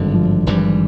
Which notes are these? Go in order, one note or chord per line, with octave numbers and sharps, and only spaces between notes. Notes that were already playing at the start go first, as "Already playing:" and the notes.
Already playing: G#1 G2 D3 D#3 F#3
F3
G#1 G2 E3 G3